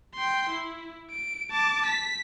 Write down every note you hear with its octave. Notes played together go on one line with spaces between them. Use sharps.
G5 C6
E4
D7
A5 D6
B6